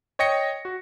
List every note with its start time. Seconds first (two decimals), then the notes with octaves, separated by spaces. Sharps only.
0.19 C#5 D#5 G5 A#6 C#7
0.65 F#4